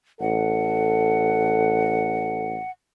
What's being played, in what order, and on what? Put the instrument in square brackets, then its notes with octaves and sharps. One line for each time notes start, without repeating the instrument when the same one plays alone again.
[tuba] A1 [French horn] A4 [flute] F#5